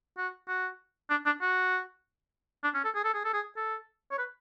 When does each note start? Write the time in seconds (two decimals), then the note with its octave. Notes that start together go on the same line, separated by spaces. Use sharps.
0.18 F#4
0.48 F#4
1.10 D4
1.26 D4
1.42 F#4
2.64 D4
2.74 C#4
2.84 A4
2.95 G#4
3.05 A4
3.14 G#4
3.25 A4
3.33 G#4
3.57 A4
4.11 C#5
4.18 B4